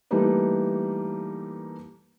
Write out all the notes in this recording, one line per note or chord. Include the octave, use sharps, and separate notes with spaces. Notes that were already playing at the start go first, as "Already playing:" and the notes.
E3 G3 A3 A#3 D#4 B4